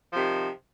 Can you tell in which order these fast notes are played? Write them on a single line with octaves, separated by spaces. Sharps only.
F3 C3 D#3